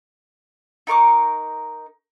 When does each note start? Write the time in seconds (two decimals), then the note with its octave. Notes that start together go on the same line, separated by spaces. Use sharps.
0.87 D#4 A#4 C#6 D6